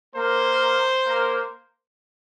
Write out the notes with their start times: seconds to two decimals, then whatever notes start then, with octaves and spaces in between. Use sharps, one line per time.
0.16 A#3 A#4 C5
1.06 A#3 A#4